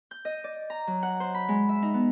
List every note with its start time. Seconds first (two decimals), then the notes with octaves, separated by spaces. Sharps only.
0.11 G6
0.25 D#5
0.44 D5
0.70 A#5
0.87 F#3
1.03 F#5
1.20 C5
1.34 B5
1.48 G#3
1.69 E5
1.82 D#4
1.94 B3